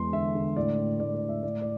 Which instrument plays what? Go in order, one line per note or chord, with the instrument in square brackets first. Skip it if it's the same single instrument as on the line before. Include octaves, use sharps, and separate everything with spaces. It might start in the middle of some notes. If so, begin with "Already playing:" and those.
Already playing: [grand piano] E2 G#3 C6
D3 E5
D3
A2 D5
A2
A2 D5
D5
A2
E5
A2 D5
D5